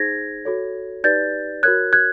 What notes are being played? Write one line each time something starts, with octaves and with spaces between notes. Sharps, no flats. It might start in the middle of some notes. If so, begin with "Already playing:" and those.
Already playing: D#4 G#4 C5 G#6 A#6
F#4 A4 C#5
D#4 G4 B4 D5 G6 A6
F#4 A#4 C#5 F#6 G#6
F#6 G#6